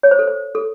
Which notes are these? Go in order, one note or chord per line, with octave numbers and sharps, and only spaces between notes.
C#5
C5
A4
C5
A4